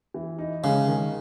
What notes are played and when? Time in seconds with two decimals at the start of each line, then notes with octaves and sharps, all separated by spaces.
0.14 E3
0.39 D#4
0.63 C#3 G#3
0.88 D#3